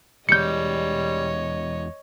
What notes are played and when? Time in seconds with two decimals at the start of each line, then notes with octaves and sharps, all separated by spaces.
0.29 E2 G3 G#3 C#5 D#5 G6 C#7